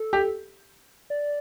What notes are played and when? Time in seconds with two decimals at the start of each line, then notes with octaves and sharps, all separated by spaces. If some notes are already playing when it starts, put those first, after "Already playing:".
Already playing: A4
0.13 G4
1.10 D5